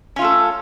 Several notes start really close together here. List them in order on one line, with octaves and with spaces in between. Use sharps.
C#4 F4 A3 A4